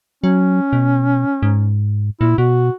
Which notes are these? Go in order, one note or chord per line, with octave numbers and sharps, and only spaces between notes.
F#3 C#4
B2
G#2
A#2 E4
B2 F#4